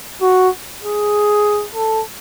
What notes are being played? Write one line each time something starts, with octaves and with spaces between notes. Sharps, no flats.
F#4
G#4
A4